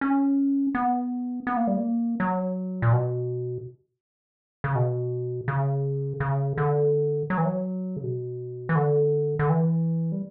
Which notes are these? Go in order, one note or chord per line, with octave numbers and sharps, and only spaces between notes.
C#4
B3
B3
A#3
G3
A#3
F#3
A#2
B2
C#3
B2
C#3
C#3
D3
F#3
E3
F#3
C#3
B2
E3
D3
D3
E3
G3